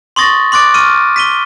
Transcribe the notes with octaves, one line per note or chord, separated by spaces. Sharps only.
C6 C#6 D#6 A6 A#6
C6 D6 F#6 A6 D7
C#6 F6 D#7
B6 D#7 G7